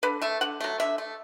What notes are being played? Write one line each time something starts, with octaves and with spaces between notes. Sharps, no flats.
D3 B4
A3 E5
D3 F#5
F#3 A3
D3 E5
A3